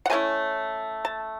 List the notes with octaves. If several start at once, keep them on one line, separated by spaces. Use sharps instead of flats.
F#5
D3 A3 C#4 E4 G#5
A5